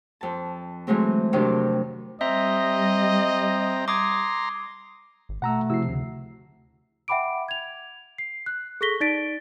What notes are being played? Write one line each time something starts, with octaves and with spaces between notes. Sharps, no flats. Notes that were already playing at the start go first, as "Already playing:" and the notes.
F2 A5
E3 F#3 G#3 A3 C4
F2 C3 D#3 F#3 D4 D6
G3 C4 D#5 E5 G5 A#5
A#5 C6 D6 D#6 G#6
G#1
B2 A3 F#5 A#5 E6
C3 F3 E4 F#4 E6 C7
D2 C#3
E5 F#5 G5 B5 D6 D7
G#6 F7
C7
F#6
G#4 A4 C#6 A#6 B6 G7
D#4 D5 A6 B6 D7